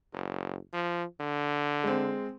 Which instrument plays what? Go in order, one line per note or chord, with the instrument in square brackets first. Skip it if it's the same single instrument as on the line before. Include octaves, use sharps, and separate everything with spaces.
[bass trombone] F#1
F3
D3
[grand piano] G#3 C4